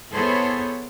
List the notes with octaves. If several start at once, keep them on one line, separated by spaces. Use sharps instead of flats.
B3 E4 G#4 A4 C5 C#5